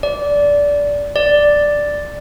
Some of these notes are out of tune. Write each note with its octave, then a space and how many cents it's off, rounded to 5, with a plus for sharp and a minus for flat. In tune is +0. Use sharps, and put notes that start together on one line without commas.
D5 -15
D5 +0